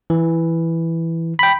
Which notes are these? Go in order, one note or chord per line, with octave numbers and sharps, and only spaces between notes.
E3
G5 B5